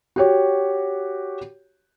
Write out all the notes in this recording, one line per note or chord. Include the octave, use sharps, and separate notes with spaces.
F#4 G4 C#5